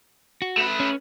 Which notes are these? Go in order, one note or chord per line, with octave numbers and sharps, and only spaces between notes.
F#4
A3 B4
C#4